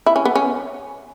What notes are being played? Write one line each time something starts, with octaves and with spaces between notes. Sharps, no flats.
E4
C#4
B3
C#4